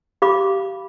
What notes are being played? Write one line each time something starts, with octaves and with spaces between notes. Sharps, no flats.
G4 F5 B5 D6